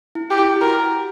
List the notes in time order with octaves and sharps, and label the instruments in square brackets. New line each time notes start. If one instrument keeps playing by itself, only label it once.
[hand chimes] E4
[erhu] G4
[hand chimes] E4
G4
[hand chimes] F#4 [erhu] A#4